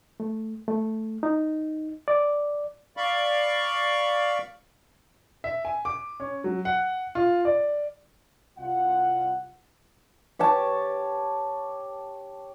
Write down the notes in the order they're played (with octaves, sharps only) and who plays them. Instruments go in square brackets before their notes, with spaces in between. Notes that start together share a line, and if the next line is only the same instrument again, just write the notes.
[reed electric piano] A3
A3
D#4
D5
[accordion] D5 F5 B5 C#6
[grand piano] E5
G#5
D6
C#4
F#3
F#5
F4
D5
[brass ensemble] C2 F4 F#5
[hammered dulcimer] G4 C#5 A5